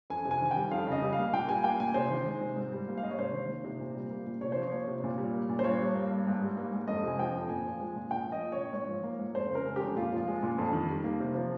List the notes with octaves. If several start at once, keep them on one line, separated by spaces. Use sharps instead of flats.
F2 G#5
C3
G#5
D#3
G5
G3
F2 F5
C#3 D#5
G3
F5
A#3
A#2 G5
G3 G#5
A#3 G5
A#2 G#5
C3 C5
D#3
G#3
C3
G#2
G3
A#3
F5
G#2 D#5
C#5
C3 C5
D#3
A#3
C3
A#2
G3
A#3
A#2
C3 C#5
F3 C5
C#5
A#3
C3
A#2
G3
A#3
A#2
C5
G2 C#5
G3
A#3
G2
G#2
G3
A#3
G#2
F2 D#5
C3 G#5
F3 G5
F2
A#2 G#5
F3
G#3
A#2
A#2 G5
F3 D#5
A#3
A#2 C#5
G#2 C#5
F3
A#3
G#2
F2 C5
C#3
A#4
G#3
F2 G4
A#2 F4
F3 F4
G#3
A#2
F2
D#3
G3
A#3
C3
F3